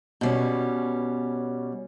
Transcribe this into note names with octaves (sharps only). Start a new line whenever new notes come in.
B2 G3 C#4